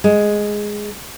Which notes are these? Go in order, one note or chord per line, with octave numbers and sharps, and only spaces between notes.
G#3